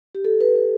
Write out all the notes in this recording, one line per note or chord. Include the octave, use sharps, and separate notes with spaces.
G4
A4
B4
B4